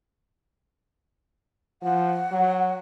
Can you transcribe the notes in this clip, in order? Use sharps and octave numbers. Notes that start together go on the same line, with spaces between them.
F3 F#5
F#3